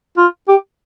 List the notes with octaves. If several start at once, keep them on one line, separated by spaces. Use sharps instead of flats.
F4
G4